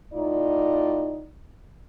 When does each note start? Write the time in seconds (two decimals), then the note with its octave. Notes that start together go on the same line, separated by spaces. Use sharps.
0.14 A2 D#4 F4 D5